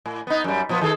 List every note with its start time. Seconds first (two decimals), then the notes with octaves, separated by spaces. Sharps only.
0.06 A2
0.27 B3 D#4
0.44 F#2 G3
0.69 A#2 F3 B3
0.81 D#3 G#4 A4